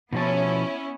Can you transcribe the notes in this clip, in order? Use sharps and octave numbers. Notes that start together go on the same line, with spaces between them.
B2 F3 B3 C#4 E4 A5